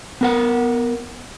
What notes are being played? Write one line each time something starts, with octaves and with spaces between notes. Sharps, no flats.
B3 A#4 F#5